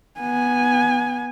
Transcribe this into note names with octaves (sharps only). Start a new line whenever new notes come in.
B3 G#5